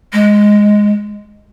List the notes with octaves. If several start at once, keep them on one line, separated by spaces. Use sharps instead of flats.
G#3